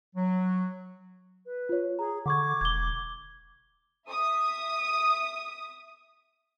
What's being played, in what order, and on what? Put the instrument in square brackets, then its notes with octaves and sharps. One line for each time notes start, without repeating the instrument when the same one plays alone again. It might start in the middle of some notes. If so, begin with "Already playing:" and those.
[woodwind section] F#3
[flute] B4
[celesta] F4 C#5
[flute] G#4 [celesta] A#5
[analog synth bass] D3 [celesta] F#5 C#6 G#6 [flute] D6
[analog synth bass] E1 [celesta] G#6 G7
[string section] E5 D#6